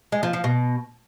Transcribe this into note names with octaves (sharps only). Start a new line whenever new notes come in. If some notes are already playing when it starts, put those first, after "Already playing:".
G#3
F3
F3
B2